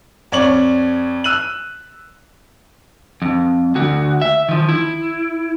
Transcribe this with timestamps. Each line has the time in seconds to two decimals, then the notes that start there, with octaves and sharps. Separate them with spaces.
0.32 F2 C#5 D5 C#6 F#7
1.24 E6 F#6 D#7 F#7
3.22 F2
3.75 D2 F#4
4.22 E5
4.49 D#3 F3
4.69 E4